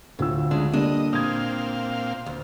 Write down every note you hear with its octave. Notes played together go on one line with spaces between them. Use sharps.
D2 A2 F4 E6
C#3 G#3 D4
D3 G3 A#3 D4 D#5
A#2 C4 F5 D#6 G#6
D2